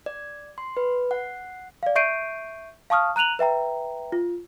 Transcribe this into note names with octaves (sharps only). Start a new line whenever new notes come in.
D5
C6
B4
F#5
D5 F5
E5 C#6 G6 C7 D7 D#7
F5 A5 C#6 D#6 F6
A#5 F#6 D#7 F7 F#7
B4 E5 G5 A#5
F4